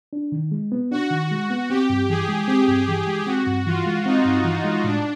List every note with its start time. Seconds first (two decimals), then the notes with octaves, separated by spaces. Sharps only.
0.13 D4
0.32 D#3
0.52 G#3
0.72 B3
0.91 D4 F#4
1.11 D#3
1.31 G#3
1.50 B3
1.70 C4 G4
1.90 G2
2.09 E3 G#4
2.28 G#3
2.48 C4 G4
2.68 G2
2.88 E3
3.07 G#3
3.26 C4 F#4
3.47 G2
3.66 E3 F4
3.86 G#3
4.06 C4 D#4
4.25 G2
4.45 E3
4.64 G#3
4.84 A2 D4